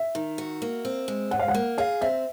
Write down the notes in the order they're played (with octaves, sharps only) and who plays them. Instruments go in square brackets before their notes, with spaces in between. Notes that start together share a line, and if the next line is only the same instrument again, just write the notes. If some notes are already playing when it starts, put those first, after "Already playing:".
Already playing: [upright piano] E5
[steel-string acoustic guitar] D#3
F#4
A#3
C4
G#3
[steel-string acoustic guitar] G#2 [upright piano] F#5
[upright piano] F5
F#5
[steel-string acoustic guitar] A#3
[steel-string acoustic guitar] G#4 [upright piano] F5
[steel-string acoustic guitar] C4 [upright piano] E5